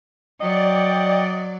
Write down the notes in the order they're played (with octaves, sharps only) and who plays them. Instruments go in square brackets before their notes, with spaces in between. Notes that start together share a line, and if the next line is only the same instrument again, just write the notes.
[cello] F#3 [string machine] D5 [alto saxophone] D#5 [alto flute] G5